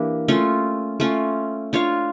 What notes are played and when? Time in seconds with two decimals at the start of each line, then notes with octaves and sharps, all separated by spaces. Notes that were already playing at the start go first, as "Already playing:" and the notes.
Already playing: E3 A#3 D4 G4
0.28 A3 C#4 F4
1.00 A3 C#4 F4
1.73 D4 F4 C#5 F5